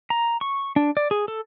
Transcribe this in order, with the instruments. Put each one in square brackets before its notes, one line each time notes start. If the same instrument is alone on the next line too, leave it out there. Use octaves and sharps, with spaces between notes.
[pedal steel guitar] A#5
C#6
D4
D5
G#4
A4